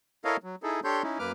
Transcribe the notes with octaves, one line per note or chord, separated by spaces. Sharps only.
E4 A4 A#4 C#5 D#5 F5
F#3
D#4 E4 G#4 A4
D4 G4 A4 C#5 C6 G6
C#4 D#4 E4
F#2 A#3 B4 D6 F6